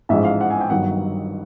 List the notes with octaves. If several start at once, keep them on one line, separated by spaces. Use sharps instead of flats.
A1 G#2 F3 G#3 E5
F5
F#5
G#5
G5
G1 G2 D#3 F#3 F#5